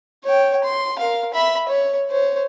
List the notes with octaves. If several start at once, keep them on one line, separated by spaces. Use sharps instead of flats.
C#5 G5
C6
A#4 F5
E5 B5
C#5
C5 C#5